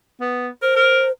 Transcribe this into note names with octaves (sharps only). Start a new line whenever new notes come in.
B3
A#4 C5
A#4